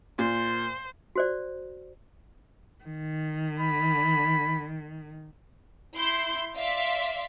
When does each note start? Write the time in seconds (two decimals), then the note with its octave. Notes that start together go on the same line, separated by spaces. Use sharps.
0.19 A#2 C5
1.16 F#4 C5 D5
2.84 D#3
3.60 B5
5.94 E4 C6 G6
6.56 D5 E5 F5 C6 B6